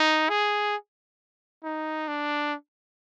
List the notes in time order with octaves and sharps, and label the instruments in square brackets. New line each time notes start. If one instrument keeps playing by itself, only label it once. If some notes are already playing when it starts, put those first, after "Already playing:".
Already playing: [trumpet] D#4
G#4
D#4
D4